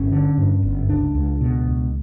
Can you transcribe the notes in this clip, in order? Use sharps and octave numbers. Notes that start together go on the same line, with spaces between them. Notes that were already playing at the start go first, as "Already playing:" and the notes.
Already playing: G1 C#4
D3
G2
G1
C#2 D4
C#2
B2
C#2